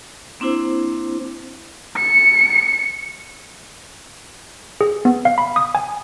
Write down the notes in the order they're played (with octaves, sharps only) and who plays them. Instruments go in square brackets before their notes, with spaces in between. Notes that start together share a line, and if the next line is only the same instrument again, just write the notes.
[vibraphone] A#3 C4 D4 E4 C5
[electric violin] C#7
[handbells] G#4
B3
F5
B5
D#6
G#5